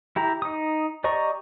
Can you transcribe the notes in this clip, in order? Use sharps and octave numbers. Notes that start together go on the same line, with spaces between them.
E4 G4 A#5
D#4 D#6
G4 D5 D#5 A#5 C#6